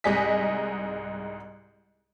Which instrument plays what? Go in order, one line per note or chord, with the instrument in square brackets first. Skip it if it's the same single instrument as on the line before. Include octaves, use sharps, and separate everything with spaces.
[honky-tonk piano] C2 G#2 D#5 G#5 B6